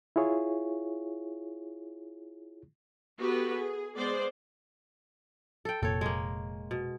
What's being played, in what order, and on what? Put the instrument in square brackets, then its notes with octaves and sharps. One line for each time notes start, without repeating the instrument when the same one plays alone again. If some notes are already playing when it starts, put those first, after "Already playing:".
[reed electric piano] E4 F4 G#4 C#5
[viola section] B3 F#4 G4 A4 B4
G#4
G#3 B3 C5 D5
[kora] A4 G5
[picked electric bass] F1 A#2 [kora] A4 C#5
[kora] G#3 A#3
B2